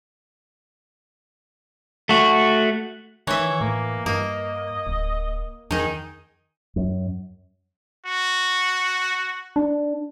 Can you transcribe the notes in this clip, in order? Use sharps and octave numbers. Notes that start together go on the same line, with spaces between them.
A3 F#4
D#3 E3 C#5 E5
A2 A#3
G2 A#3 D#5
D1
F2 D#3 D#4 G#4
F#2
F#4
D4